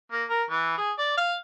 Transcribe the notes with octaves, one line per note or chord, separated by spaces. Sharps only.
A#3
A#4
E3
G#4
D5
F5